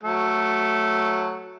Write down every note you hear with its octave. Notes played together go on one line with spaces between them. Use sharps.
F#3 A3